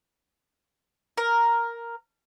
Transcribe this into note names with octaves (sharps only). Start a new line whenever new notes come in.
A#4